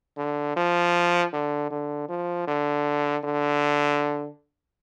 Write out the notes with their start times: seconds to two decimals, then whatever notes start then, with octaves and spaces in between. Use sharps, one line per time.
0.17 D3
0.56 F3
1.33 D3
1.70 D3
2.09 F3
2.47 D3
3.24 D3